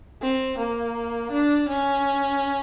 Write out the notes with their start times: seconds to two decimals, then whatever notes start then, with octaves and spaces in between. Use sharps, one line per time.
0.22 C4
0.58 A#3
1.31 D4
1.68 C#4